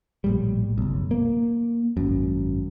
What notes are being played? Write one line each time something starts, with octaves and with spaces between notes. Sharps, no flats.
A#1 A2 G3
F#1 B1
A#3
G#1 F#2